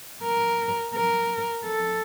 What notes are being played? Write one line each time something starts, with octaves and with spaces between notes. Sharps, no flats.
A#4
A#4
A4